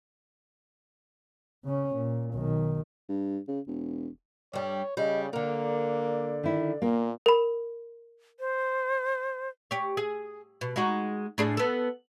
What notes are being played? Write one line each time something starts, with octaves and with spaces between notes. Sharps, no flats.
C#3 C#4
A#2
B1 D#3
G2
C#3
E1
G2 G3 C#5
C#3 G3 D#5
D3 A#3 A#4 D5
D#3 E4
A#2 A#3
A#4 B5
C5
G4 C#5
G#4
B2
G#3 D#4 F#4
A2 D4 G#4
B3 A4